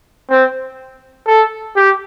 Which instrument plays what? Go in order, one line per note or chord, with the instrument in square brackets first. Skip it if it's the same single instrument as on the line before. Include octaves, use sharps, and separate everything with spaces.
[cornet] C4
A4
G4